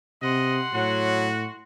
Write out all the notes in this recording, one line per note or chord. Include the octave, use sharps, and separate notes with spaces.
C3 D#5 F#5 C6
A2 F#3 F#4